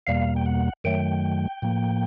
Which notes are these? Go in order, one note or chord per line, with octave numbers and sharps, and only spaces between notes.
E2 B2 G3 A#3 F5
G5
F#5
F#2 D#3 F#3 A3 G5
A2 F3 A#3